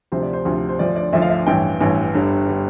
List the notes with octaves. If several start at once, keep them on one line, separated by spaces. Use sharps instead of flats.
D2 C3 F3 C5
D5
C5
D2 C3 F3
C5
D2 D3 F3 D5
D5
D2 D3 F3 E5
F5
E5
A1 G2 E3 G5
A1 G2 E3
G1 G2 D3 G3
D3 G3